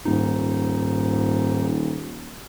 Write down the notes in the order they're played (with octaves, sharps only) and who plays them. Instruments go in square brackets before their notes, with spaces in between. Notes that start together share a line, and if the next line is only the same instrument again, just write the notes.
[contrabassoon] D#1 [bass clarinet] G#2 [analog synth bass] D#4